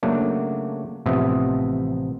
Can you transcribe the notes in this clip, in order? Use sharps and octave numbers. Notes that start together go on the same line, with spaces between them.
C#3 F#3 A3 A#3 D4
A1 C3 F3 B3 D#5 E5